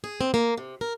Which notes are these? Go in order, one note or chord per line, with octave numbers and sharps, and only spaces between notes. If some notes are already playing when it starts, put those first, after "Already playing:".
G#4
C4
A#3
C3
A#4